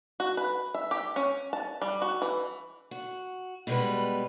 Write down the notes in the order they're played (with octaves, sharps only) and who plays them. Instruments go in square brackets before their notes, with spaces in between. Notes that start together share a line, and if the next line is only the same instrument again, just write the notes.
[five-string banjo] F#4
B4
E5
G4
C#4
A5
G3
F#4
E3
[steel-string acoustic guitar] F#4
B2 G3 G#3 B4